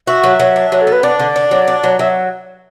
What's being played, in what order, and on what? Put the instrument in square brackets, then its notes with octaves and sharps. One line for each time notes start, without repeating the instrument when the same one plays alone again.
[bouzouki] F#4 [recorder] E5
[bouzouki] F#3
F#3
D4
F#3
[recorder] A4
[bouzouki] B3
[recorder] B4
[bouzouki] D4 [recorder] D5
[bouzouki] D3
D4
F#3
D4
F#3
[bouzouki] F#3 [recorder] E5